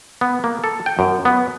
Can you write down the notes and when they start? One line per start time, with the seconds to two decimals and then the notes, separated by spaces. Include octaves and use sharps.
0.21 B3
0.44 A#3
0.64 A4
0.86 G5
0.99 F#2
1.25 B3